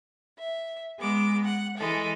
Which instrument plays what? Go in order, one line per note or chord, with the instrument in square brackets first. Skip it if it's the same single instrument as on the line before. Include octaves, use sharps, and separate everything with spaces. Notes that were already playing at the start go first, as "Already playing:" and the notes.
[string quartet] E5
G#3 B3 D6
F#5
E3 G#3 A4